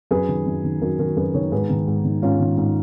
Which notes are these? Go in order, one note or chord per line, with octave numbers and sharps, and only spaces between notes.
F#2 G#4 B4
D#3
F#2
D#3
F#2 F#4 A#4
D#3 F#4 A#4
F#2 G#4 B4
D#3 A#4 C#5
G#2 G#4 B4
D#3
G#2
D#3
G#2 C#4 F4
D#3
G#2